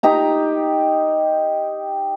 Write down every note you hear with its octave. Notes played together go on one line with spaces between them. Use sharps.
D#4 G4 A#5